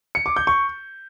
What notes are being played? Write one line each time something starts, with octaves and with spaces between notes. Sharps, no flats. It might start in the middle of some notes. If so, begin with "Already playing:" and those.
C#7
D6
G6
C#6